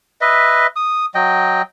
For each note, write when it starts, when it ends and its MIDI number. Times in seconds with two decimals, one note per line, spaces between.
0.21 0.67 71
0.21 0.67 75
0.21 0.67 76
0.76 1.06 87
1.15 1.62 54
1.15 1.62 75
1.15 1.62 79